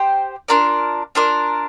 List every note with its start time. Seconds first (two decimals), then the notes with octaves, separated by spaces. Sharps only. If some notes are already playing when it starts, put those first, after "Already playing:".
Already playing: G4 C5 G5
0.48 D4 F4 A#4 D5
1.15 D4 F4 A#4 D5